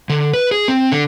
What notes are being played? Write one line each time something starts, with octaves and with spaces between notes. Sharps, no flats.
D3
B4
G#4
C4
D3